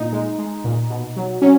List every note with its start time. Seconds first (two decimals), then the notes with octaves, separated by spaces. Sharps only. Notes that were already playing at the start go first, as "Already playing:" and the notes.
Already playing: A#2 D#4
0.13 G#3
0.38 G#3
0.64 A#2
0.90 B2
1.16 F#3
1.42 F#3 C#4